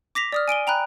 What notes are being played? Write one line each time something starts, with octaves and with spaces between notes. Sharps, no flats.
D6 A#6 B6 F7
D5 D#6 F6
G#5 D7 D#7 G7
G5 A#5 B5 F#6